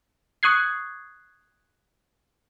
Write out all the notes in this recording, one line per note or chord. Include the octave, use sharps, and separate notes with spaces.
C#6 D#6 F#6 G#6 C7